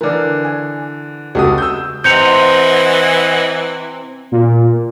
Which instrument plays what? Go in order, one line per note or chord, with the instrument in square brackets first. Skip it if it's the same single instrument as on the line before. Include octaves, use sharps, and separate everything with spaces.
[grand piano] D3 E3 [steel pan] A#4 D5
[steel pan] G#5
[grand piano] C#2 C#3 D#6 [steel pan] F#4 G4 A4
[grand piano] E6 G6
[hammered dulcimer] C3 [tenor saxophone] E3 [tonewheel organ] D#5 F#5 B5 [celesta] G6 C#7 F7
[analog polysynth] A#2